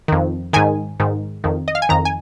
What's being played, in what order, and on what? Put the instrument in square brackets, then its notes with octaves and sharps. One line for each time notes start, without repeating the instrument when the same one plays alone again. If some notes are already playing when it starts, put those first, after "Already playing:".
[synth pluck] F2 D#3
G#2 D#3 G#5
G#2 D#3
F2 D#3
D#5
F5
G#5
F2 D#3 A#5
G#5